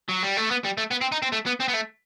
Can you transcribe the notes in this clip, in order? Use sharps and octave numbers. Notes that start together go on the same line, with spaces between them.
F#3
G3
A3
B3
G3
A3
B3
C4
D#4
C4
A3
B3
C4
B3
A3